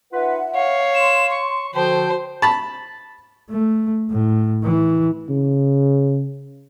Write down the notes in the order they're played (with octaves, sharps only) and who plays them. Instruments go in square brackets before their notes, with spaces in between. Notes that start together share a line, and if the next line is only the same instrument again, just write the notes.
[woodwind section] D#4 F4 B4 [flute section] E5 F#5
[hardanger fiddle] C#5 [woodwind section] F5
[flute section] C6 [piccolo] E7
[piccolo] C#6
[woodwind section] D3 F3 [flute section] F#4 A5 [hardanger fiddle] C5 [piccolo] G5
[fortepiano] A5 B5
[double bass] A3
A2
E3
[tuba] C#3